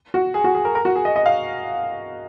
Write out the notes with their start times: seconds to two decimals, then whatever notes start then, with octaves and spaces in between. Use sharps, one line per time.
0.14 F#4
0.34 G#4
0.44 F#4
0.55 G#4
0.65 A#4
0.75 A#4
0.85 F#4
0.96 G#4
1.05 D#5
1.16 D#5
1.26 F5